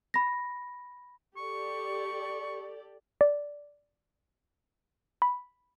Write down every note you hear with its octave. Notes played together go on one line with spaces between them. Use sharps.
B5 A#6
G4 A4 D5 C#6
D5
B5